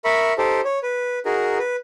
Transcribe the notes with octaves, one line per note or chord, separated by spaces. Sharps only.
A#4 E5 B5 C#6
D#4 G4 A4 C5
C#5
B4
D#4 F#4 G#4 A#4
B4